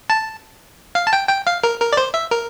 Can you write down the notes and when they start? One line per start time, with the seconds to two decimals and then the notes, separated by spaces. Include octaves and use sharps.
0.10 A5
0.95 F5
1.07 A5
1.13 G5
1.29 G5
1.47 F5
1.63 A#4
1.81 A#4
1.93 D5
1.97 C5
2.14 E5
2.31 A#4